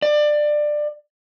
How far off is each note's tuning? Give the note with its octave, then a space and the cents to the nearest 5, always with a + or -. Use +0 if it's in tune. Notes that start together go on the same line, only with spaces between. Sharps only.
D5 +20